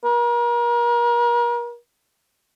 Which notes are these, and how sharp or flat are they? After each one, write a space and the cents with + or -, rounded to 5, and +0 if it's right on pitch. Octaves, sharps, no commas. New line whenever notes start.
A#4 +35